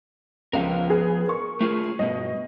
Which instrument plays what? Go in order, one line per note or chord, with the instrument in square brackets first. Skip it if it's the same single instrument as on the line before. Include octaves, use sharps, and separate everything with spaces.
[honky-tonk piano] C#2 F4 [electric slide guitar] F3 B3 A#4
[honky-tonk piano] G#4 B4
A#4 C#6
[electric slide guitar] A3 F4 G#4
[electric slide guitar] G2 B2 [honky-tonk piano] D#5